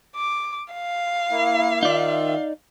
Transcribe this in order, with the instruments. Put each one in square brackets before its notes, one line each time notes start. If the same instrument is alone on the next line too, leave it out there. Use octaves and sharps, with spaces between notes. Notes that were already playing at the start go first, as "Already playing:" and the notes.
[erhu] D6
F5
[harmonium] A#3 E4
[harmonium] D#3 F4 E5 [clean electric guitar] D#4 D5